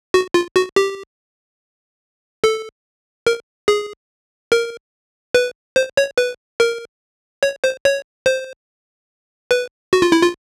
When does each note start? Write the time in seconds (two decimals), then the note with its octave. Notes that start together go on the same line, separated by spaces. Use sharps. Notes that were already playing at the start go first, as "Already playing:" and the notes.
0.14 F#4
0.34 F4
0.56 F#4
0.76 G4
2.44 A4
3.27 A#4
3.68 G#4
4.52 A#4
5.34 B4
5.76 C5
5.97 C#5
6.18 B4
6.60 A#4
7.43 C#5
7.64 C5
7.85 C#5
8.26 C5
9.51 B4
9.93 F#4
10.02 F4
10.12 E4
10.23 F4